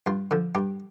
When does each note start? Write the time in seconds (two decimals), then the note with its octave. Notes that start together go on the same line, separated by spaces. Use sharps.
0.06 G2 F4
0.31 D3 F3
0.55 G2 G4